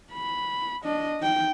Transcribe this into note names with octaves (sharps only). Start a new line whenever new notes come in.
B5
D4 D#5
D#4 G5